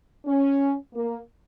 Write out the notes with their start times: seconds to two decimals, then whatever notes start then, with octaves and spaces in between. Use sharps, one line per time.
0.26 C#4
0.94 A#3